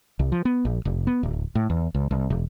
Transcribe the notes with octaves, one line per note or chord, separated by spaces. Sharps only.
C2
F3
B3
A#1
F1
B3
D1
A2
E2
C#2
C2
E1